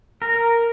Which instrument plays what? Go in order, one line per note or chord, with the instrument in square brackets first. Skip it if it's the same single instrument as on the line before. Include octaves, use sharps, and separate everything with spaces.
[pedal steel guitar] A#4